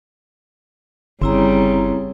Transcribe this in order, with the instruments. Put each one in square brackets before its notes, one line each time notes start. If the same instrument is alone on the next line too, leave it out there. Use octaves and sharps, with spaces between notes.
[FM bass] G1 [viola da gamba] C#3 G3 [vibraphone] C4 E4 A#5